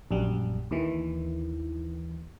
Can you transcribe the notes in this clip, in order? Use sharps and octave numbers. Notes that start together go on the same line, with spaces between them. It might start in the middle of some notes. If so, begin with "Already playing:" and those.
A#1 F#2 G3
D#2 D#3 E3